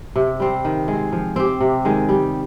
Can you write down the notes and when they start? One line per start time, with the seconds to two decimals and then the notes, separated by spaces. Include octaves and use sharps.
0.16 C3
0.40 G3 C4
0.65 D#3
0.88 G#3
0.93 C4
1.12 F3
1.36 C4 G4
1.61 C3
1.85 D#3 G#3
2.09 G3